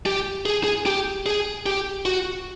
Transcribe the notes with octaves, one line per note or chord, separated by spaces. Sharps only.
G4
G#4
G#4
G4
G#4
G4
F#4